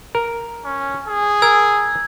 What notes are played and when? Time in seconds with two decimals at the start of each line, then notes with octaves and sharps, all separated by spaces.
0.15 A#4
0.65 C#4
1.08 G#4
1.42 A#4 E6 G#6